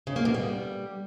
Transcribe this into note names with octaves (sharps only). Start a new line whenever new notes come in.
C#3
A#3
B2
G3